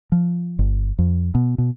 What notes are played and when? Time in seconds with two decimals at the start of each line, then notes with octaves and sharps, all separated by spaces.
0.12 F3
0.59 G1
0.99 F2
1.35 B2
1.58 B2